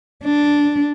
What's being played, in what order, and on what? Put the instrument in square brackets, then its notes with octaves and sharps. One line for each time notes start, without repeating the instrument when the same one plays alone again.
[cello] D4